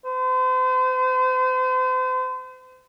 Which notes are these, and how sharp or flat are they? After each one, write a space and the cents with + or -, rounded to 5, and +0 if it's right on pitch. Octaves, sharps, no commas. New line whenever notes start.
C5 -40